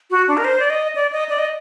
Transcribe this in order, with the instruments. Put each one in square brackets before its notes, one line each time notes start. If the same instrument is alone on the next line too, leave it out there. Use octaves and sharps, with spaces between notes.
[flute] F#4
D4
A#4
C5
D5
D#5
D5
D#5
D5
D#5